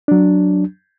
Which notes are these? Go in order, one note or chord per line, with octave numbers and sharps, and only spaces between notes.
F#3 D4